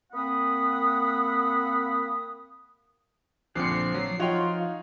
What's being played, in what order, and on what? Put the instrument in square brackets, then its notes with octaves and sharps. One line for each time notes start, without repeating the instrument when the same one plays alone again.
[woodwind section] A#3 C4 F#5 B5 D#6
[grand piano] A#1 C4 C#7 [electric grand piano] D3 F3 [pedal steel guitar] D5 F#5 [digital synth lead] C7
[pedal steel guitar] F3 [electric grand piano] F#3
[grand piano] D#4 C#5 F7 [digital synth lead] F4 [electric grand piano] F#5 G5